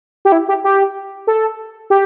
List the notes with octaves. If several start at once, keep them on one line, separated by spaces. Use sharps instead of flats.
G4
E4
G4
G4
A4
G4